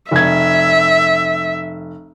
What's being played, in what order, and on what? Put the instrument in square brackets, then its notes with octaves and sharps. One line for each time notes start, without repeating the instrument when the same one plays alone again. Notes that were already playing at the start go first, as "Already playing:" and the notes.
[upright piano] F1 G#6 [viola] E5